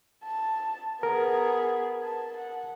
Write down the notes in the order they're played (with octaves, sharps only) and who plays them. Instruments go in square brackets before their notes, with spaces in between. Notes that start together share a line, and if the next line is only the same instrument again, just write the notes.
[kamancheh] A5
[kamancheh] B3 G#4 [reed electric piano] A#4
[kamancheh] A5
F#5